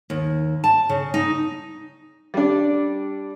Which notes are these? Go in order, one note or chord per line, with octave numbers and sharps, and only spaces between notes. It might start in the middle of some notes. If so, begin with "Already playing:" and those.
D#2
A5
C#3
D#4
G3 D4